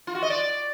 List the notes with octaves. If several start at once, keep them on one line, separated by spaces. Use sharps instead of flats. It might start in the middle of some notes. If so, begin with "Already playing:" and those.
F4
F#4
D#5
D5